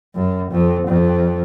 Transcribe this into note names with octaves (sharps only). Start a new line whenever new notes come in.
F#2
F2
F2